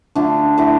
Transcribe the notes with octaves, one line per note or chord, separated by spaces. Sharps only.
D3 A3 D4 F4
D3 A3 E4 G4